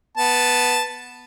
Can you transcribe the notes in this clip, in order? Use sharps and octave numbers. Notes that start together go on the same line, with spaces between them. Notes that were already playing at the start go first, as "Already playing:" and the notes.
B3 A5